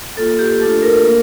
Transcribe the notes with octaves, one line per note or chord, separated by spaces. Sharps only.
A#3 F4 A4
G4
A3 D4 F4 A4
A#4
A#3